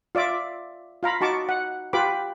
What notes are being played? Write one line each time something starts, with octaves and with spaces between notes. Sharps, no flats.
F4 D5 E5 D6
F4 F5 A#5 B5
D#4 F#4 A5 C#6 D6
F#5
F4 G4 B4 B5 D6